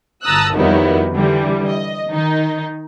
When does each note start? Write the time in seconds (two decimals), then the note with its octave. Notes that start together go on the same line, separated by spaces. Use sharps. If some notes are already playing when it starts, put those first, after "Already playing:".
0.23 G1 A5 A#5 D#6 E6 F#6
0.54 F2 D#3 F#3 G3 B3 E4
1.12 D3 E3 G3
1.67 D#5
2.10 D#3 D#4